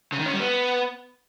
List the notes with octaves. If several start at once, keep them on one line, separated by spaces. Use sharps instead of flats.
C#3
D#3
C#4
G3
B3